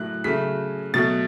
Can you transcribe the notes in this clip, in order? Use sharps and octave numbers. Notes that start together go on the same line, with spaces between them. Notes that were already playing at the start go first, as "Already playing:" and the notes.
Already playing: A2 F#3 A3 F#6
C#3 F#3 A3 B6
B2 F#3 A3 A6